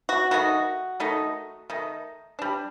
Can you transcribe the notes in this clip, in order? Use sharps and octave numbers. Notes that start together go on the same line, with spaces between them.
F#4
D#3 A3 D#4 F#4
D#3 A3 D#4
D#3 A3 D#4
G3 D4